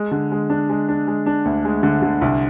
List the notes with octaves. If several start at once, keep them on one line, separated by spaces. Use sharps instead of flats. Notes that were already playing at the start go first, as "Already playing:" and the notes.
Already playing: G#3
D3
G#3
D4
G#3
D4
G#3
D4
D2
G#3
D3
D3
C2